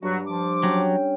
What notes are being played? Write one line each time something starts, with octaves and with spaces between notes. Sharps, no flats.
G2 F#3 F#4 C#6
F3 D6
F#3 C#4 G5